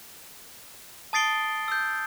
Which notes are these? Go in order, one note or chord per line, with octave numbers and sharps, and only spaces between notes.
A5 D#6 A6 C7 D7 G7
E6 G6